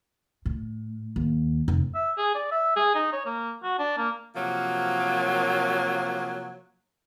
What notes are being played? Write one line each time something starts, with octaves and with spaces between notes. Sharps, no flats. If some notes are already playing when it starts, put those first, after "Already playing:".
A2
D#2
F1
E5
G#4
D5
E5
G#4
D#4
C#5
A#3
F#4
D4
A#3
C3 F3 F#3 A#3